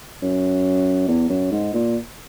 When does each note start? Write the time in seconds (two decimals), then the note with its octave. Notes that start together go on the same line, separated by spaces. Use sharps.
0.22 F#2
1.08 E2
1.29 F#2
1.52 G#2
1.74 A#2